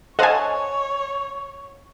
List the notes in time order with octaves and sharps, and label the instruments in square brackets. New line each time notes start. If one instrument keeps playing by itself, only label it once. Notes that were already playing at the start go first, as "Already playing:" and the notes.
[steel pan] A4 A5 [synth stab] C5 F5 F#5 [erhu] C#5 [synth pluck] D#5 G#5